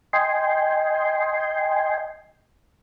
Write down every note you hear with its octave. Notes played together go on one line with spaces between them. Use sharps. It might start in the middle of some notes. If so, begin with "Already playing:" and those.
D#5 G5 G#5 C6